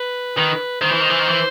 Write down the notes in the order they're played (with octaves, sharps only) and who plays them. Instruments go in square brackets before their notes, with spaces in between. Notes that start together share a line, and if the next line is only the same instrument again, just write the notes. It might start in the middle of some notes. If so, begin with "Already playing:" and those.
Already playing: [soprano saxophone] B4
[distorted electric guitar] D#3 [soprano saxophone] B4
[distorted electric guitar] D#3 [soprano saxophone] C5
[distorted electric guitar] E3
D#3
E3
D#3
E3